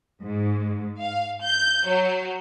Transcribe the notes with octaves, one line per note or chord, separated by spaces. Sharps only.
G#2
F5
G6
F#3